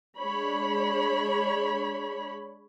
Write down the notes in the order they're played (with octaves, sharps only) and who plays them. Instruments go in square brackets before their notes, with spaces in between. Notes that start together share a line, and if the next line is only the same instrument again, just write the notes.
[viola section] G#3 D4 C#5 B5